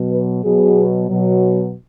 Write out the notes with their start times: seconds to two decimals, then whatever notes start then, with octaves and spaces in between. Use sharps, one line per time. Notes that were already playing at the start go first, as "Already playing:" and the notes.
Already playing: B2 F#3
0.11 B4
0.44 B2 F#3 G#4
1.09 B2 F#3